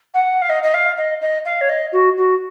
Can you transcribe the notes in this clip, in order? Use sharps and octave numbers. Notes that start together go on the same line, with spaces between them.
F#5
F5
D#5
D#5
F5
D#5
D#5
F5
C#5
D#5
F#4
F#4